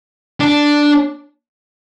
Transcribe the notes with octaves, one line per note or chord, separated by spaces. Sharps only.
D4